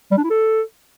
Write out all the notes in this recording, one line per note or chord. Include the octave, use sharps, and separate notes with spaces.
G3
D4
E4
A4